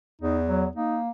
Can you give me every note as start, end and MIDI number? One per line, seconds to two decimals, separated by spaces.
0.22 0.68 40
0.22 0.38 63
0.46 0.66 54
0.76 1.10 58
0.76 0.98 63